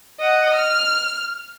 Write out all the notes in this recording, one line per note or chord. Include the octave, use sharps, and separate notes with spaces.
D#5 F#5
F6